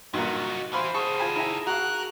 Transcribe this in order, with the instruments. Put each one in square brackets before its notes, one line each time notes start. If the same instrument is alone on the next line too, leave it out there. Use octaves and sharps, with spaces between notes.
[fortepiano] G2 A#2 [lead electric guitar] F#3 D#4 [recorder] F#4
[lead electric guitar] E3 E4 [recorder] C5 [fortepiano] F5 B5 C6
[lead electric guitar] F#4 A4 [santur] G#4 [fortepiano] C#6
[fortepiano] F4 G#5 B5
[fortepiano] E4 E5 G#5 [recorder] A#5
[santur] F#4 [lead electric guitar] A#4 [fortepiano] F5 A#5 [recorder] F#6